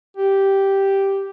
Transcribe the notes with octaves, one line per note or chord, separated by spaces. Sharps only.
G4